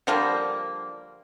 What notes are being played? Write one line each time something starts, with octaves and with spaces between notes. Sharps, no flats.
D3 F3 G3 A#3